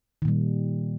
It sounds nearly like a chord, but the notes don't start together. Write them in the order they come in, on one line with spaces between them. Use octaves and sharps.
D#3 A#2 G3